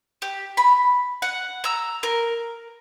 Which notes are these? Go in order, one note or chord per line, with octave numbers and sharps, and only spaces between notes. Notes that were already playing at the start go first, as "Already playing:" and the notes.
G4
B5
F#5
A#5 E6
A#4